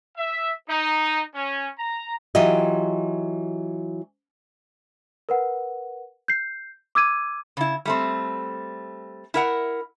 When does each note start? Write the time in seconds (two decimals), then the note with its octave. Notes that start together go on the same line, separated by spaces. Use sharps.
0.16 E5
0.69 D#4
1.34 C#4
1.78 A#5
2.35 E3 F#3 F4 G4 D#5
5.29 A#4 B4 F#5
6.28 G6 C7
6.95 D6 E6 G#6 D#7
7.57 C#3 E4
7.85 G3 A3 C4
9.34 E4 A#4 F#5